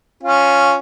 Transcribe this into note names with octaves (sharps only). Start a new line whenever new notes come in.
C#4 F4